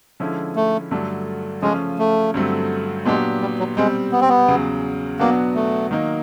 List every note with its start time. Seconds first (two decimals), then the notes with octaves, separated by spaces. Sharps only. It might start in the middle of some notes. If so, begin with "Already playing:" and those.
0.20 D3 F3 G#3 C#4 E4
0.56 A3
0.91 G2 D3 F#3 A3 D4
1.62 C#3 F3 G#3 A3 C#4 F4
1.99 A3
2.34 G2 D3 F#3 A3 C4
3.05 A#2 F#3 G#3 B3 D4 G4
3.41 G3
3.59 F#3
3.77 B2 G3 G#3 C4
4.12 B3
4.21 C4
4.29 B3
4.48 E2 C#3 F#3
5.19 B2 F#3 A#3 B3 D4 F#4
5.55 A3
5.91 D#3 F#3 A#3 D#4